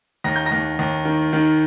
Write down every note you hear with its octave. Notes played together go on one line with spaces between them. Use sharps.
D#2 A#6
G6
A#6
D#2
D#2
D#3
D#3